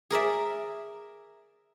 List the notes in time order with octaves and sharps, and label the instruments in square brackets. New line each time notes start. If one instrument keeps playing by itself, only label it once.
[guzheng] G#4 A#4 D5 E5